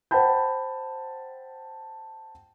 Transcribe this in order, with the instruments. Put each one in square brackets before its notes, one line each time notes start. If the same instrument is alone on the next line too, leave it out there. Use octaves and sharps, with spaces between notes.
[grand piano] C5 F#5 G5 A5 B5 G6